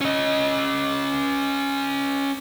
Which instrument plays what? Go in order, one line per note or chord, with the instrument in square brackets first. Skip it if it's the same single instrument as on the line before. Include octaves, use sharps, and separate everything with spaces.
[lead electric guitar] C#4 D#5